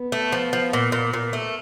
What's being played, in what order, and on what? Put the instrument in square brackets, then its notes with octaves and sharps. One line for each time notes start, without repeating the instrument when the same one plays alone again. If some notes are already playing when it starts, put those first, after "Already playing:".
Already playing: [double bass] B3
[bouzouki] A3
F3
F3
A#2
A#2
A#2
A3